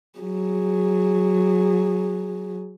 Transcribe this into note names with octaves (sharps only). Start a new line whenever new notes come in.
F#3 G#4